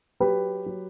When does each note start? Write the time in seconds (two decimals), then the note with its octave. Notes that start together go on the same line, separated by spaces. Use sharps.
0.20 F#3 G4 B4
0.66 F#3